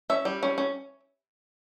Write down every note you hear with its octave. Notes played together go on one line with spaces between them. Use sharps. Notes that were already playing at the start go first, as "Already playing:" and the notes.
C#4 E5
G3
C#4
C#4